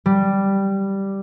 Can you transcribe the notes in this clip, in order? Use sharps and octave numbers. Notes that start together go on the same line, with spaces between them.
G3